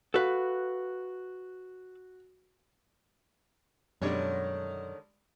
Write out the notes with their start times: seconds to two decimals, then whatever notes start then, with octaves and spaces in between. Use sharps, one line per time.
0.14 F#4 A4 B4 F5
4.02 F#2 B2 D3 D#3 G3 G#3 D4 C#5